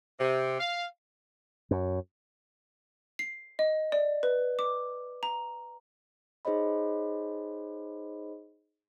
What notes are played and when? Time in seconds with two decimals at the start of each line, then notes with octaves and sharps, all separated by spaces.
0.19 C3
0.60 F5
1.71 F#2
3.19 C7
3.59 D#5
3.92 D5
4.23 B4
4.59 D6
5.23 A#5
6.45 D#4 G#4 C5 C#5 D#5 B5